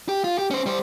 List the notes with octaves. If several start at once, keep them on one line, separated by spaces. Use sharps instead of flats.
G4
F4
G4
C#4 C5
G3 C5